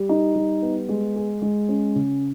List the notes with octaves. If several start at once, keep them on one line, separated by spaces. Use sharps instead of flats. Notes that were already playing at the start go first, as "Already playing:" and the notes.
Already playing: G3
D#4
G3
B3
G#3
G#4
G#3
C#4
C#3